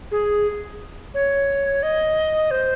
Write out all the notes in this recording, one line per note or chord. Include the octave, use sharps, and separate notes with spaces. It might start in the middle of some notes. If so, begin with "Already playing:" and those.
G#4
C#5
D#5
C5